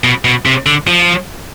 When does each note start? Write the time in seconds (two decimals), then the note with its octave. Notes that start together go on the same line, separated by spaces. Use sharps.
0.04 B2
0.25 B2
0.45 C3
0.66 D3
0.88 F3